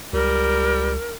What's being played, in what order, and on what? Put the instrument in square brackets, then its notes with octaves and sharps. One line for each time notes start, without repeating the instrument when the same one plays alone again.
[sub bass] C#2 [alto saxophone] G3 [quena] A#4